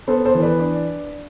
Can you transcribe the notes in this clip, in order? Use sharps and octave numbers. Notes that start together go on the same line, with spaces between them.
B3 A4 C5
A4 C5
E3
B4 D5
D4